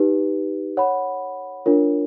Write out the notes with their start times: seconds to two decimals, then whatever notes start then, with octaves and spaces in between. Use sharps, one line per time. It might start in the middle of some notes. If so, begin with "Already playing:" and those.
Already playing: D#4 G4 B4
0.77 C#5 F#5 B5
1.66 D4 F4 A#4 C#5